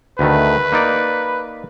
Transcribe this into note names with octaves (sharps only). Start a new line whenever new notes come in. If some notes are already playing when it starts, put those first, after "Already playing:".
D2 D#3 A3 B4
A#3 D#4 D5